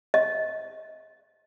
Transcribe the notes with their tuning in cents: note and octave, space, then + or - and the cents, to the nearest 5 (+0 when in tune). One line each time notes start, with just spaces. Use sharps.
D#5 +30